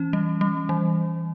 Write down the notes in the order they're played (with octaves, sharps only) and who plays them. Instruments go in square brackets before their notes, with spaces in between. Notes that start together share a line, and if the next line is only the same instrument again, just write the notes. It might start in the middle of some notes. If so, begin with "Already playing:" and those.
Already playing: [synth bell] E3 C#4
G3
G3
E3